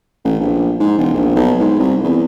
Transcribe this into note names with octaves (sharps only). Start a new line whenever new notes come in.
A1
A#1
G#2
E1
A#1
B1
G#2
C2
E2